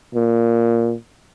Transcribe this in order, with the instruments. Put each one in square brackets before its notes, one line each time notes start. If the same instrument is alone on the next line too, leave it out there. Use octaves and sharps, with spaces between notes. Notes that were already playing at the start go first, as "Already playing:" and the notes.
[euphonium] A#2